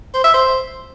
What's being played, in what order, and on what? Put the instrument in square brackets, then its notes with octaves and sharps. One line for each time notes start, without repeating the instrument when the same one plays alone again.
[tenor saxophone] C5
E5
C5